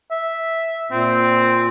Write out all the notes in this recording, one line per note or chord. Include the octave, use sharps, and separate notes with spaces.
E5
A#2 C4